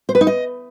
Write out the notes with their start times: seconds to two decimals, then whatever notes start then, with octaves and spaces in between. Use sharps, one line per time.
0.09 C5
0.15 B4
0.21 D#4
0.27 D#5